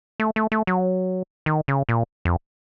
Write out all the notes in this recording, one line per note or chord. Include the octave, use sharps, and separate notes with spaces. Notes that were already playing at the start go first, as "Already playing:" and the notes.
A3
A3
A3
F#3
D#3
C#3
A#2
F2